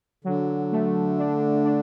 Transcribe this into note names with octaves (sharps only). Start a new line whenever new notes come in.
D3 F#3
A3
D4
D4